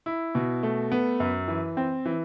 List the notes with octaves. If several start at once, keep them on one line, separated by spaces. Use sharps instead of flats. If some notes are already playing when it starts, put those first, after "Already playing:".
E4
B2
A3
B3
F#2
E3
C4
E3